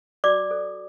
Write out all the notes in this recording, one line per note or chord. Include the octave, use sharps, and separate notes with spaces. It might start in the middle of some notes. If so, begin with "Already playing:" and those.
F#4 D5 D6
A4 C5